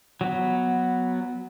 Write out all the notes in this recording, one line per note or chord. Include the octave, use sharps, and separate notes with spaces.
F#3 B3